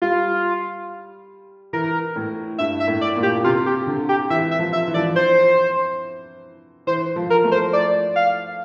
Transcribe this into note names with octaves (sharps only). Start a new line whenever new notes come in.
G3 F4
E3 A#4
A2
G2 E5
E5
A2
D5
A#2
G4
C3 F4
G4
D3
G4
E3 E5
E5
F3
E5
E3
F3 D5
E3
C5
E3 C5
F3
A#4
A3
C5
D5
F5